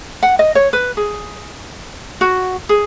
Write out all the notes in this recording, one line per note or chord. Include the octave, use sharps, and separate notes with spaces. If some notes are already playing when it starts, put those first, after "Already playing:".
F#5
D#5
C#5
B4
G#4
F#4
G#4